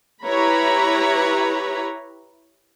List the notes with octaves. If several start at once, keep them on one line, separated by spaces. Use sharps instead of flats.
E4 G4 B4 C#5 A#5 B5